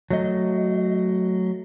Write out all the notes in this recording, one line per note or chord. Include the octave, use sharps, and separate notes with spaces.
F#3 A3 D#5